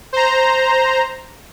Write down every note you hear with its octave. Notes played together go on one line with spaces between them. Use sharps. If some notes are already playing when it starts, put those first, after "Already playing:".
C5 A#5